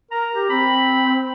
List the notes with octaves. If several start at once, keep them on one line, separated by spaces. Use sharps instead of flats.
A#4 A#5
G4
C4 B5